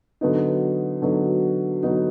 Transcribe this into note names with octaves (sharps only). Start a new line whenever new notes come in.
D3 F#3 B3 D#4
D3 F#3 B3 D#4
D3 F#3 B3 D#4